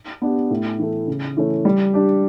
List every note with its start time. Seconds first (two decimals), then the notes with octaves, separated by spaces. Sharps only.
0.22 B3 D4 G4
0.51 A2
0.79 E3 A3
1.07 C#3
1.37 E3 A3 C#4
1.65 G3
1.94 D4 G4